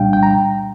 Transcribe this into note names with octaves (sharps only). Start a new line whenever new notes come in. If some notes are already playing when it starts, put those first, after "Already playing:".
Already playing: C2 A#2 G3 D4 F5 G5
G5
A#5